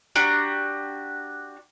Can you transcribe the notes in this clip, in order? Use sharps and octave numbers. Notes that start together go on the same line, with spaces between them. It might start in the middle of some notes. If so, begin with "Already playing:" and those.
D4 F#4 G4 A#5